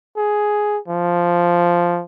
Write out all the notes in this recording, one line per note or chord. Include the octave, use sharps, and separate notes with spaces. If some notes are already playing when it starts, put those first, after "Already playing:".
G#4
F3